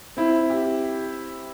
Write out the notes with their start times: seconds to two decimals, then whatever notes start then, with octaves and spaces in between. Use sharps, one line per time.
0.17 C4 E4
0.50 G4